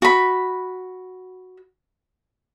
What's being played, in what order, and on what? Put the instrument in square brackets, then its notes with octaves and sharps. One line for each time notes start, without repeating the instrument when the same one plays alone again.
[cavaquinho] F#4 B5